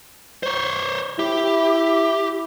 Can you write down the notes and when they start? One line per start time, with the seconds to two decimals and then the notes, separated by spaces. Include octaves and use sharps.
0.43 C5 C#5
1.19 E4 G4